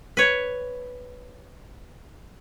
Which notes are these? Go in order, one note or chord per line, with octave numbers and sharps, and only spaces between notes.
B4 C#5